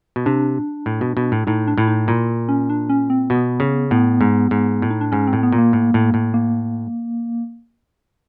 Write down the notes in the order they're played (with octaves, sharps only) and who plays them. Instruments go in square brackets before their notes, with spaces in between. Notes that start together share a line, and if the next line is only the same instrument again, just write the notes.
[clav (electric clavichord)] B2
[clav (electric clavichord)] C3 [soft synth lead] D4
[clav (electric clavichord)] A2
B2
B2
A2
[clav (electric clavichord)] A2 [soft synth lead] D#4
[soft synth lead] D4
[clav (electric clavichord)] A2 [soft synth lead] E4
[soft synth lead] D#4
[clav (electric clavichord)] A#2 [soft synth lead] E4
[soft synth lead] C#4
D4
C#4
C4
[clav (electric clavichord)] B2 [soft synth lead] B3
[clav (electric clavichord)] C#3
[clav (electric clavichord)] A2 [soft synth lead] B3
[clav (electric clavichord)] G#2
G#2
A2
[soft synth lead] D#4
D4
[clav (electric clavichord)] G#2 [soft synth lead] C#4
[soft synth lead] C4
[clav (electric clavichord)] A2
[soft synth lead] B3
[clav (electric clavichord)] A#2
[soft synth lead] A#3
[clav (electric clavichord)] A2
A2
A2
[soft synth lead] A#3